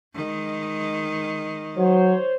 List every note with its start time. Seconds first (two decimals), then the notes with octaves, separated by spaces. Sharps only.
0.15 D#3 G#3
1.78 F#3 C5 C#5